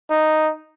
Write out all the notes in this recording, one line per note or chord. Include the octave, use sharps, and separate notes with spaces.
D#4